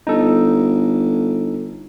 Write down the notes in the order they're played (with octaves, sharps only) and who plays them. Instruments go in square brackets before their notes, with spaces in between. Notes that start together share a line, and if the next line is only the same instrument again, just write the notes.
[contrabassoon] G1 [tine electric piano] D#4 A4